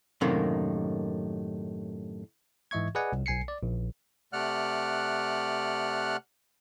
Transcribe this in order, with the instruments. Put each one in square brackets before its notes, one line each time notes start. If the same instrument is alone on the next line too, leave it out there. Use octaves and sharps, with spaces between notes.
[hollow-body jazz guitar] F#2 A2 C3 D#3 A#3
[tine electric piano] G#2 E3 D#5 E5 C#6 G#6
G#4 B4 D5 D#5 F#5 G#5
C2
B1 G#5 C7 C#7
D5
A#1
[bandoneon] C3 A3 D5 F#5 F6 F#6